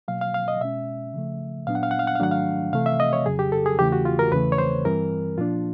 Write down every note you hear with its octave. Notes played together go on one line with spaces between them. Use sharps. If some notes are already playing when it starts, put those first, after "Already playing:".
B2 F#3 A#3 F5
F5
F5
D#5
B2 G#3 C#4 E5
C#3 F3 A3
A#2 F#3 B3 D4 F5
F#5
F5
F#5
F5
F#5
F5
G#2 D#3 F#3 A3 D4 F#5
F5
C3 E3 A3 F5
E5
D#5
C#5
F2 C#3 F#3 G#4
G4
A4
G#4
E2 C#3 E3 A3 G4
F#4
F4
A#4
E2 C#3 E3 A3 B4
C#5
C5
G2 E3 G3 C4 A#4
A#2 F3 A#3 D4 F4